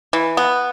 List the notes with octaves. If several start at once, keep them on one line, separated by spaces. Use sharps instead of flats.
E3
B3